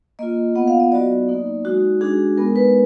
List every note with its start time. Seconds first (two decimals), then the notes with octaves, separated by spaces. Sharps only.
0.19 A#3 F4 D#5
0.55 B3 F4 F#5
0.68 F5
0.80 D#5
0.92 F#3 B3 D#4 F#4 D5
1.28 F#3 A#3 D#4
1.65 G#3 D#4 F#4
2.01 G#3 D4 F#4 G#4
2.37 G#3 B3 D#4 A#4
2.56 B4